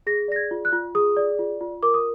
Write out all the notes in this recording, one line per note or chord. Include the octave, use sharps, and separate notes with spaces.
G#4 A#6
D5 A#6
G#6
F4
F#6
F4
G#4 D#6
D5
F4
F4
A#4 D6
D#6